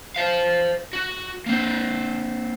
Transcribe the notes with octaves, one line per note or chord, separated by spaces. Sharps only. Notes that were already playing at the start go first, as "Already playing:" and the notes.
C5 F5
F#4
A#3 C4